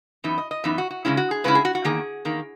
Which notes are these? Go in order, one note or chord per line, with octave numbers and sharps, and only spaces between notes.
F#2 E3 B3 D#4 E5
D#5
D#5
F#2 E3 B3 D#4 E5
F#4
F#4
C#3 G#3 C#4 E4
F#4
G#4
C#3 G#3 C#4 E4 B4
G#4
F#4
F#4
E2 D#3 A#3 G#4
E2 D#3 A#3